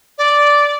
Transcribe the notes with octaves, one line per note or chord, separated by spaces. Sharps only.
D5